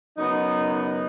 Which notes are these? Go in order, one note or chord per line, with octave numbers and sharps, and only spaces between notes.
F#2 C#3 B3 D#4
D#4